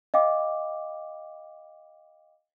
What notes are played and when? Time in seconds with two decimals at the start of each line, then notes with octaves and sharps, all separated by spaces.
0.14 D#5 F5 G5 D6